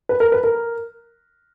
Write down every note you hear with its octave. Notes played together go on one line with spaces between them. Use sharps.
B4
A#4
B4
A#4